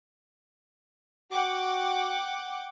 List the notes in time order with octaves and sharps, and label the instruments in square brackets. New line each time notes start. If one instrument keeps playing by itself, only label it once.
[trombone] F#4 [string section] F#5 G5 D6